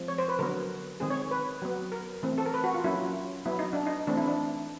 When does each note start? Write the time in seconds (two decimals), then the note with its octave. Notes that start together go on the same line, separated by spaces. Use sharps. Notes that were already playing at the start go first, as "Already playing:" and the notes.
Already playing: F3 G#3 C4
0.08 C#5
0.18 C5
0.29 B4
0.39 D3 F#3 B3 A#4
1.00 D#3 G#3 C4 G#4
1.10 C#5
1.31 B4
1.62 F#3 B3
1.92 A#4
2.23 E3 A3 C4
2.38 A4
2.46 A#4
2.54 B4
2.64 F#4
2.74 F4
2.84 F#3 A#3 C#4 E4
3.46 F#3 B3 E4
3.59 D#4
3.73 D4
3.86 D#4
4.07 E3 A3 C4 D4
4.17 E4
4.28 D4